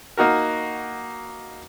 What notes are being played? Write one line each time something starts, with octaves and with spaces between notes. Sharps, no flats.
A#3 D#4 F#4 A#4